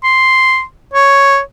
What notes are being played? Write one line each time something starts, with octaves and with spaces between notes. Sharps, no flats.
C6
C#5